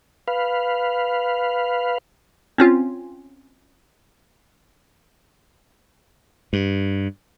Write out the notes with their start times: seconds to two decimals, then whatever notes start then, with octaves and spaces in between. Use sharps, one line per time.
0.28 B4 F5
2.58 C4 C#4 F4
6.53 G2